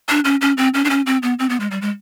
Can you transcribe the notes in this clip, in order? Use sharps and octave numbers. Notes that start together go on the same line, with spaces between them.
D4
C#4
C#4
C4
C#4
D4
C#4
C4
B3
C4
B3
G#3
G3
G#3